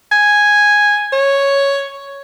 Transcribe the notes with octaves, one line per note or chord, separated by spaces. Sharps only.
G#5
C#5